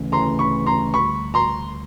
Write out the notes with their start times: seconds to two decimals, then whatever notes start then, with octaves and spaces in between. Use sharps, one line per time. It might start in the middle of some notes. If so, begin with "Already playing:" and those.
Already playing: D2 C#3 E3 A3 C#4
0.12 D2 C#3 E3 A3 C#4 A#5 C6
0.39 B5 C#6
0.66 A#5 C6
0.94 D2 D3 G3 B5 C#6
1.34 A#5 C6